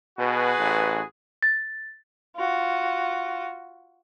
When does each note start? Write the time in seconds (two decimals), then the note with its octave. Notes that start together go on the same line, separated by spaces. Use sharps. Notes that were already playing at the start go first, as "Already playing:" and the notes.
0.18 B2 F#4 G#4 B4
0.59 A1
1.43 A6
2.37 F4 F#4